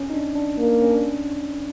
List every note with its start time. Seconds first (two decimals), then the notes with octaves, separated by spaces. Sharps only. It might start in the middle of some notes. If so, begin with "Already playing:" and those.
Already playing: C#4
0.10 D#4
0.14 D4
0.35 D4
0.58 A#3
0.82 C#4
0.90 D4